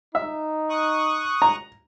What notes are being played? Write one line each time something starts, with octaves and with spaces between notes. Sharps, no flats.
D#4 E5
C#6 D#6 F#6
A#5